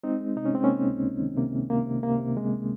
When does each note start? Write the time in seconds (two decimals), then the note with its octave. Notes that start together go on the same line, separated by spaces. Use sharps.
0.03 G#3 C4 D#4
0.20 G#3
0.36 C3 D#4
0.45 C#4
0.54 G#3 C4
0.64 A#3 C#4
0.70 C3
0.87 C#2
1.03 C#2
1.20 D#3
1.37 C3 A#3
1.53 C3
1.70 C3 A#3
1.87 C3
2.03 C3 A#3
2.19 C3
2.37 C3 G#3